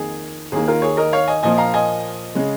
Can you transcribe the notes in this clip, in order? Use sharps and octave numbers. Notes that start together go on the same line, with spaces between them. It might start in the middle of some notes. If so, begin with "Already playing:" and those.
Already playing: F2 D#3 A#3 G#4
D#2 D#3 A#3 G#4
F4 A#4
G#4 C#5
A#4 D#5
C#5 F5
D#5 G#5
A#2 F3 A#3 D#5 G#5
F5 A#5
D#5 G#5
C#3 G#3